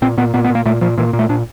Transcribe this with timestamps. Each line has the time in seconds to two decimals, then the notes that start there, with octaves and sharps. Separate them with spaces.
0.02 A#2 C4
0.18 A#2 B3
0.34 A#2 B3
0.45 B3
0.50 A#2 A#3
0.66 A#2 A3
0.81 A#2 F3
0.98 A#2 E3
1.13 A#2
1.19 A3
1.29 A#2 D4